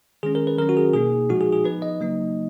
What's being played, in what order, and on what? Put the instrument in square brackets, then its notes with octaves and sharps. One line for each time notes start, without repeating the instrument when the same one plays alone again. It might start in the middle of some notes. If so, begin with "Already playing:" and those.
[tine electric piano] D#3 G#3 C#4 G#4
A#4
B4
D#3 F#3 C#4 A#4
F#4
G#4
B2 A#3 D#4 G#4
A#2 F3 G#3 D#4 F#4
G#4
G#4
F3 B3 D#4 B4
D#5
C#3 F#3 A#3 D#4